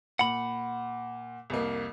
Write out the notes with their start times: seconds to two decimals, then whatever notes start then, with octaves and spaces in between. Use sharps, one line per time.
0.19 A#2 F#5 B5
1.50 C2 F2 A#3